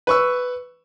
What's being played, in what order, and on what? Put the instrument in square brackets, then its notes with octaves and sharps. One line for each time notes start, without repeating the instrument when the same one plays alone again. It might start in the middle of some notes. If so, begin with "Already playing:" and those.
[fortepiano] B4 C#6 E6